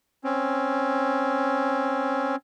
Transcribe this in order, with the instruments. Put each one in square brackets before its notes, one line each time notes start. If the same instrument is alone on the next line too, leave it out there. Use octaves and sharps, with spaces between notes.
[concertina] C4 C#4